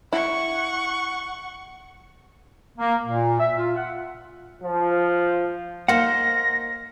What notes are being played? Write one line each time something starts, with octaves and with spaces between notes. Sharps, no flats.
E4 F#5 C#6
A#3
A#2
E5
F4
F#5
F3
A#3 D#4 C5 F5 F#5 A#6